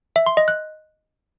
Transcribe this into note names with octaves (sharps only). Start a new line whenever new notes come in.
E5
C6
D#5
F#6